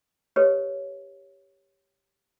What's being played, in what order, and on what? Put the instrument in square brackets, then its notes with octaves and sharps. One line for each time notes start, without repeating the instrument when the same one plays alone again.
[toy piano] G4 A4 B4 C#5 D#5